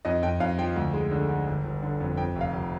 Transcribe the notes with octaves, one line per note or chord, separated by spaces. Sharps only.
F2 D#5
F2 G5
F2 F5
F3 G5
D2
G#3
D3
D3
G1
G1
D3
F2
F2 G5
F1
F5
F1